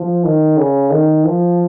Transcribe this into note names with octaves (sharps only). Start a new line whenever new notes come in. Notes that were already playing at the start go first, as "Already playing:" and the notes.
Already playing: F3
D#3
C#3
D#3
F3